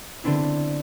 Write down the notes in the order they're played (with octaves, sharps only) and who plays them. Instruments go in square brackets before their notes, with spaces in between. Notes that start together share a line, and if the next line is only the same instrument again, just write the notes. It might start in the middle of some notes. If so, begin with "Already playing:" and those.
[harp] D3 B3 C4 D4 E4